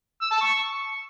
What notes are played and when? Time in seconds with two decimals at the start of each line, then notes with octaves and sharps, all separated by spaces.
0.22 E6
0.31 A5
0.41 C#6